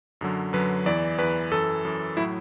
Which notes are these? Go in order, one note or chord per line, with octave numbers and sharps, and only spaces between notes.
F#2 D3 F#3
F#2 D3 F#3 B4
E2 E3 D5
E2 E3 B4
F#2 E3 A4
F#2 E3
A2 F#3 E4